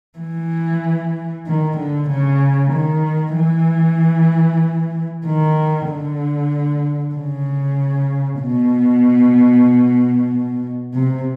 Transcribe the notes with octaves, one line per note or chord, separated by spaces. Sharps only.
E3
D#3
D3
C#3
D#3
E3
D#3
D3
C#3
B2
C3